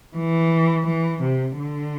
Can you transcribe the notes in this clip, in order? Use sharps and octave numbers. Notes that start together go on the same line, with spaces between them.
E3
E3
C3
D3